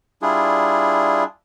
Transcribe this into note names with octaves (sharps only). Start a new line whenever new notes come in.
G3 D4 E4 F4 G#4